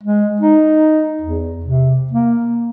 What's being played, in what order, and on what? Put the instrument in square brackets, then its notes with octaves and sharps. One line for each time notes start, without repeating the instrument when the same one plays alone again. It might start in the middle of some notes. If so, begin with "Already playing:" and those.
[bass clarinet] G#3
D#4
E2
C3
A#3